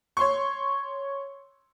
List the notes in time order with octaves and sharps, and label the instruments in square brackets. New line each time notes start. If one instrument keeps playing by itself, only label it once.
[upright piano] C#5 C6 C#6